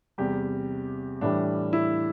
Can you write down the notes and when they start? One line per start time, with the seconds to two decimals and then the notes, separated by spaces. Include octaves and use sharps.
0.18 E2 C3 G3 G4
1.21 A2 E3 G3 D4
1.73 E4